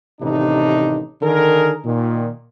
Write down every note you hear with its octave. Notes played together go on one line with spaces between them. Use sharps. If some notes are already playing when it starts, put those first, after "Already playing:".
A1 C3 D#3 D4 D#4
D3 D#3 G#4 A#4
A#2 D#3